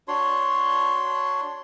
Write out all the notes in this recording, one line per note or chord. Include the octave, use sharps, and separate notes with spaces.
D4 F#4 C#5 C6